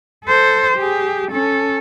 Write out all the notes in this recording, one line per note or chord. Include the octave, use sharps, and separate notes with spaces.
A4 C5
G4 G#4
C#4 A4